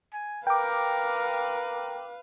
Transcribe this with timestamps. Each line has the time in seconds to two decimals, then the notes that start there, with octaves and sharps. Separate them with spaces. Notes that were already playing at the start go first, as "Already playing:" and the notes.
0.13 G#5
0.47 A#4 B4 F5 G5 D6